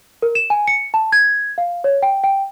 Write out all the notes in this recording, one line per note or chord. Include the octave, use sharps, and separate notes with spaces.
A#4
E7
G#5
C#7
A5
G#6
F5
C#5
G5
G5